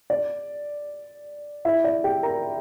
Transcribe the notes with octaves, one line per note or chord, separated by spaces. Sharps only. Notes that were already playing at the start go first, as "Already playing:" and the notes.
D5
E4 E5
D5
G4 G5
A#4 A#5